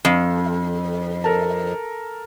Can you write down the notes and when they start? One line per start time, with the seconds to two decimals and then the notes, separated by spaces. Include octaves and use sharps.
0.05 F2
1.24 A4 A#4 A5